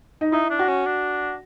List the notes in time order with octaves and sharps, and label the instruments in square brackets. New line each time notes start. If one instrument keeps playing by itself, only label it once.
[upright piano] D#4
[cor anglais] D#4 [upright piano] E4
[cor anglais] D4
[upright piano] F#4
[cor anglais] C#4
D4